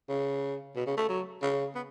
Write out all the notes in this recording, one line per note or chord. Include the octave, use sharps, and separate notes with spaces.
C#3
B2
C#3
A3
F#3
C#3
B3